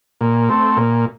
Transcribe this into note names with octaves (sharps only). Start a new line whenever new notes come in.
A#2
A3 C4
A#2